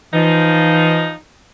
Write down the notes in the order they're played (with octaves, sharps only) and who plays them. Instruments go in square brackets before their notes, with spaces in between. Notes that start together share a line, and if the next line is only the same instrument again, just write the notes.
[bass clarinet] E3 [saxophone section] F3 D#4